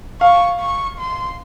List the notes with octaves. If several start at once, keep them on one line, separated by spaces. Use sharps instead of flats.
F5 C#6
C#6
C6